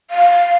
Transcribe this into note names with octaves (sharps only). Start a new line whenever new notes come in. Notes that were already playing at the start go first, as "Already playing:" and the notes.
F5